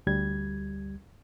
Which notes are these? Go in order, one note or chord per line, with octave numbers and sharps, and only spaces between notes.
D2 G3 G#6